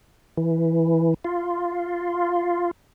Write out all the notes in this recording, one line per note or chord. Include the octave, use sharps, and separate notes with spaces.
E3
F4